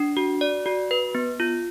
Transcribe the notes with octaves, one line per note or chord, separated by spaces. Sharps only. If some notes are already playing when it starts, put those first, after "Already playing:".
Already playing: D4
F#4
D5
F#4
B4
B3
F4